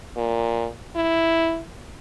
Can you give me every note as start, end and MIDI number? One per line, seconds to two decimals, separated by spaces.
0.16 0.67 46
0.96 1.60 64